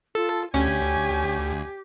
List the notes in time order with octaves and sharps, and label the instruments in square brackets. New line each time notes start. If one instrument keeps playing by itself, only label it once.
[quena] F4 [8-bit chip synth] A4
[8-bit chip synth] D2 [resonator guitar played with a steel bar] C#4 [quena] G4 [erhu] G#5